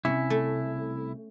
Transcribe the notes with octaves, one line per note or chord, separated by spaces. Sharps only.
C2 A2 C3 C#4 E4
A3